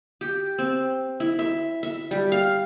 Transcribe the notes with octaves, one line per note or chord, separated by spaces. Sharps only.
G4
C4
E4
E5
E5
G3
F5